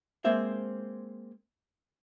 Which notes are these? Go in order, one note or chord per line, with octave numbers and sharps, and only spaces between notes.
G#3 A#3 C4 C5 E5